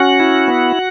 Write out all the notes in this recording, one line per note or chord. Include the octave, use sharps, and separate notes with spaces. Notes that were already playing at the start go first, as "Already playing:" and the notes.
Already playing: C#4 F#4 F#5
E4
B3